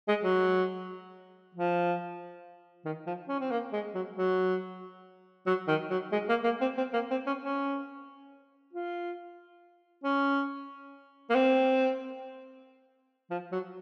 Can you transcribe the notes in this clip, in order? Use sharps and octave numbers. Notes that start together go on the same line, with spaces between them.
G#3
F#3
F3
D#3
F3
C#4
C4
A#3
G#3
F#3
F#3
F#3
D#3
F#3
G#3
A#3
A#3
C4
C4
A#3
C4
C#4
C#4
F4
C#4
A#3
C4
F3
F#3